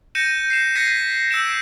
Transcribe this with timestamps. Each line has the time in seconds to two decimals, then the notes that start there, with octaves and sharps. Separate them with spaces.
0.15 G6 A#6 C#7 D#7 E7
0.50 C7 E7
0.75 F#6 G#6 A#6 B6 C#7 D#7
1.31 E6 G6 D7 E7